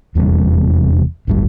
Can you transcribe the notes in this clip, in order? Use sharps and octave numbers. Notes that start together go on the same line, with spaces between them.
F1 E2 C3 G3
D1 G1 G3